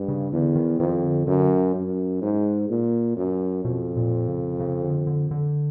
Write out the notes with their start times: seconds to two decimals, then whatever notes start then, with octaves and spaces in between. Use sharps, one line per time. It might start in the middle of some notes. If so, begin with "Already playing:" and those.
Already playing: G2
0.08 C#3
0.32 E2 D3
0.55 D#3
0.80 F2 D#3
1.03 D3
1.27 F#2 D3
1.75 F#2
2.22 G#2
2.70 A#2
3.17 F#2
3.65 F2 B2
3.97 A#2
4.28 C#3
4.60 C#3
4.82 D3
5.07 D3
5.31 D3